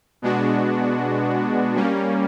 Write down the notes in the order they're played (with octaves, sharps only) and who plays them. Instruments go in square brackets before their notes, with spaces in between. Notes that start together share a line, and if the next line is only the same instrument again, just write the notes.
[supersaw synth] B2 G#3 B3 D4 F#4
G3 A#3 C#4